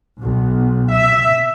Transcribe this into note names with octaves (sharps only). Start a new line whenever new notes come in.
B1
E5